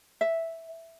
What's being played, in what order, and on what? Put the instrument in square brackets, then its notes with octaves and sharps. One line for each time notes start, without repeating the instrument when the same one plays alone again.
[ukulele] E5